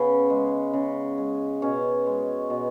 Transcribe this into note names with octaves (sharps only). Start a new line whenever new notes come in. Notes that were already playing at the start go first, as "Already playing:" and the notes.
Already playing: C#3 B3 C#4
G#3
C#3
G#3
B2 C#4
G#3
B2